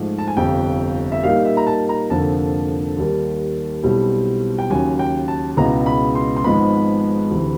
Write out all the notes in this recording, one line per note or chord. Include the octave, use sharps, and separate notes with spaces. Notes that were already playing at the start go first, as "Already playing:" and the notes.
Already playing: G#2 F3 A3
A5
G#5
G1 F2 C3 G5
E5
A#2 G3 A#3 D#4 F5
E5
A#5
A5
A#5
F1 F2 D3 F3 A#3 A5
D#2 D#3 G3 A#3
B1 B2 G3 C4 E4
G5
D#2 C#3 F#3 G#5
G5
A5
C#2 B2 G#3 B3 E4 A#5
B5
C6
C6
G#1 G#2 F3 G#3 B3 B5
D2 C3 E3